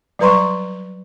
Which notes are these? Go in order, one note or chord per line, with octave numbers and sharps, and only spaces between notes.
F#3 G3 B4 A#5 C6 C#6